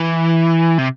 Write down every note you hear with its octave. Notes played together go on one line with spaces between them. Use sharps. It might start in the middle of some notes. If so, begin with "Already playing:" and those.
Already playing: E3
C3